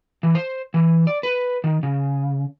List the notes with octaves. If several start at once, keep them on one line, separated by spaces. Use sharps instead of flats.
E3
C5
E3
D5
B4
D#3
C#3